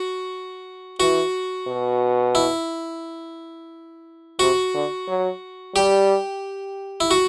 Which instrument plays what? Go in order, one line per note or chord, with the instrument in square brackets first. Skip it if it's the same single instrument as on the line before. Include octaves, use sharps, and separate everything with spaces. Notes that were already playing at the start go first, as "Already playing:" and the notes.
Already playing: [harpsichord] F#4
[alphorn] E3 [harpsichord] F#4
[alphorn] B2
[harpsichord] E4
[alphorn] C3 [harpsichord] F#4
[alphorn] D3
F#3
[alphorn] G3 [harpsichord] G4
[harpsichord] E4
F#4